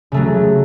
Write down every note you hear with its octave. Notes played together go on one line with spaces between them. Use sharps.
C#3 F#3 A3